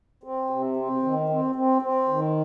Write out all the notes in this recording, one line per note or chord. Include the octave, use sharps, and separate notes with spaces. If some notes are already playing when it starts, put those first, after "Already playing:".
C4
C3
C4
D#3
C4
C4
C4
D#3